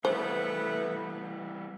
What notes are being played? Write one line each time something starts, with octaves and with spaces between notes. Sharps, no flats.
E3 G3 A3 B3 C5